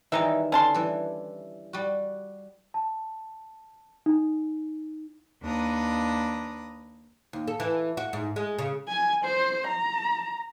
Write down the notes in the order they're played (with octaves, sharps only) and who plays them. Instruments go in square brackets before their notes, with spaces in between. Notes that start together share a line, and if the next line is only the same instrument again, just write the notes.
[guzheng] D#3 E3 G3 [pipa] G#3 D#4 E5
[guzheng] D3 [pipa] C#4 A5 C6
[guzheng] E3 G3
G3 F#4
[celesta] A5
D#4
[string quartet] D#2 D4 B4 A#5 D#6
[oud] D#2
A4
E3
F#4
G#2
G#3
C#3
[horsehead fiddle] G#5
C5
A#5